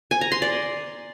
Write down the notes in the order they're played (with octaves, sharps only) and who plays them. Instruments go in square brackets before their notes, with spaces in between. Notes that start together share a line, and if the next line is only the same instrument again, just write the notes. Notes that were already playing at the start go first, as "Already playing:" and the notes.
[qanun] G#5
A#5
C6
D5